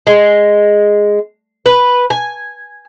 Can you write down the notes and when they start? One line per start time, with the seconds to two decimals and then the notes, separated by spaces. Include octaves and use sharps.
0.07 G#3
1.66 B4
2.10 G#5